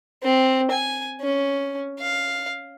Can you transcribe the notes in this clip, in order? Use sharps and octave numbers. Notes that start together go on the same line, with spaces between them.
C4
G#5
C#4
F5